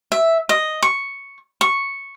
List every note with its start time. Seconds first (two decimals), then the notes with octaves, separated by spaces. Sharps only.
0.12 E5
0.49 D#5
0.83 C#6
1.61 C#6